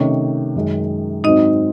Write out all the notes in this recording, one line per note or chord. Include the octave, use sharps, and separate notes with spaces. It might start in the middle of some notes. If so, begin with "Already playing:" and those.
Already playing: C3 D#3 A3 C#4 D#4 C#5
F#2 D#3 G#3
G#2 F#3 C4 D#4 D#5